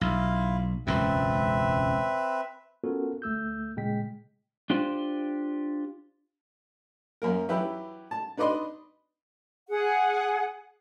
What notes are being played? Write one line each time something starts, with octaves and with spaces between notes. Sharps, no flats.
B1 E4 F4 F5
E1 C#2 F#2 C4 B4 E5
B3 C#4 F4 F#4 A4 A#4
D2 A3 E6 G6
A#2 C#3 G#3 G5 B6
D4 F4 G4 C5
F#2 A#3 A#4
E3 F#3 G4 B4 E5
A5
D4 D#4 B4 D5 D#5 C6
G#4 F#5